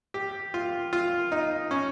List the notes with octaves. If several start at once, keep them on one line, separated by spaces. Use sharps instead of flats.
G4
F4
F4
D#4
C#4